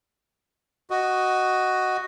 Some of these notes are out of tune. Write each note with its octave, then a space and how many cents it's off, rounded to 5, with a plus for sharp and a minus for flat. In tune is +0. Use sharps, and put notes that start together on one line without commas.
F#4 +10 D#5 +0